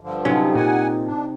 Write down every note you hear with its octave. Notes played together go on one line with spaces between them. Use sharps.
G2 D3 F3
C3 F#3 C#4 D#4
A#2 F#5 G#5
D4